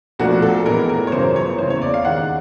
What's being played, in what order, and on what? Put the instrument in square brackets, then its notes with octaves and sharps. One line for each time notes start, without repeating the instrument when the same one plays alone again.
[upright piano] B1 A#2 F3 A3 D4 F#4
A4
A2 E3 G#3 B3 A#4
A#4
C#5
G1 F#2 C#3 E3 C5
C#5
F#1 E2 C#3 C5
C#5
D5
F5
D#2 D#3 G#3 F#5